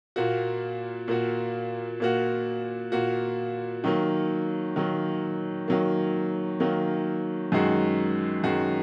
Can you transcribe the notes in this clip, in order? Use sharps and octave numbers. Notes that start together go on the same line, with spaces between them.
A#2 A#3 F#4
A#2 A#3 F#4
A#2 A#3 F#4
A#2 A#3 F#4
D#3 F#3 A#3
D#3 F#3 A#3
D#3 F#3 A#3
D#3 F#3 A#3
F#2 D#3 G#3 F#4
F#2 D#3 G#3 F#4